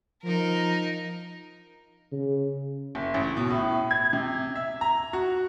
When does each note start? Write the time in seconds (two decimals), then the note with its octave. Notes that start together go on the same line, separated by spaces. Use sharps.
0.23 F3 D#4 A#4
2.12 C#3
2.95 F#1
3.14 A1
3.37 B2
3.51 A2
3.91 G#6
4.13 C3
4.56 E5
4.81 A#5
5.13 F#4